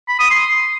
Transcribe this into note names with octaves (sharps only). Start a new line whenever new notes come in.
B5
D#6
C6